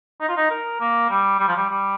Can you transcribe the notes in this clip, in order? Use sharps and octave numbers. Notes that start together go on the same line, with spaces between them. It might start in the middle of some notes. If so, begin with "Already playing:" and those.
D#4
F4
D#4
A#4
A#3
G3
G3
F3
G3
G3